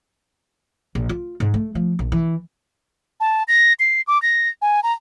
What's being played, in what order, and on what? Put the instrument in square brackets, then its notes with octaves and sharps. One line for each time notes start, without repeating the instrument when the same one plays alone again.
[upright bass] A#1
F4
G#2
A3
F3
A#1
E3
[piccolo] A5
A#6
C7
D6
A#6
G#5
A#5